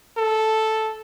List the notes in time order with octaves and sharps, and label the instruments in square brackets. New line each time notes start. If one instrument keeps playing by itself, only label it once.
[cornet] A4